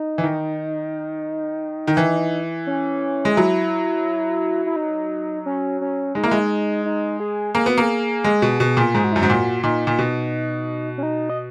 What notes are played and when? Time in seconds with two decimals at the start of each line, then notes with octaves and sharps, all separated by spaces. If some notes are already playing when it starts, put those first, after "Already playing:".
Already playing: D#4
0.18 E3
0.24 D#3
1.87 D#3
1.97 E3
2.67 C#4
3.25 G#3
3.37 F#3 E4
4.66 E4
4.76 D#4
5.46 C#4
5.81 C#4
6.15 G#3 D#4
6.24 A#3
6.27 G#3 E4
6.40 D#4
6.85 D#4
7.20 G#4
7.54 A#3 G#4
7.66 B3 F#4
7.78 A#3 G#4
8.24 G#3
8.42 B2
8.60 B2
8.77 A#2
8.94 G#2 G#4
9.04 F#4
9.12 F#2 E4
9.22 G#2 F#4
9.30 A#2
9.63 A#2 D#4
9.87 A#2
9.99 B2
10.98 C#4
11.03 D#4
11.30 D#5